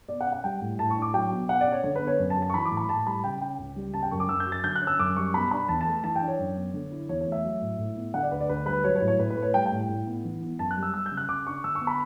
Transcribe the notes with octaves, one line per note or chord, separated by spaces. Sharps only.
B2 D5
F#5
C#4
F#5
G3 G5
A2
A2 A5
C#6
D4
D6
F#3 G5
B2
B2 F#5
D5
C#4
C#5
D3 C#5
B4
B3
C#5
F#2
A5
F#3
A5
C#6
E3 B5
D6
A2
B5
A2 A5
G3 B5
C#3 G5
C#4 G5
C#2
G3
C#3 A5
G5
F#2 C#6
D6
F#2 E6
G6
F#3
A6
D3 G6
F#6
C#4
E6
F#2 D6
G3 C#6
B2 B5
D4 B5
E2 A5
A5
A3
E3 A5
G5
D4
C#5
F#2
B3
D3
E4
E2 C#5
C#5
A3
E5
F#3
A2
A2
B3
D3 F#5
D5
D2 B4
D5
D2 B4
G3 B4
F#3 C#5
C#5
A2
C#5
A2 B4
B4
A3
C#5
G3 G5
G5
A2
A2
B3
E3
B3
F#2 A5
F#6
G3
E6
G3 E6
G6
C#3
F#6
C#3 D6
D4 C#6
D3 E6
C#6
B3
B5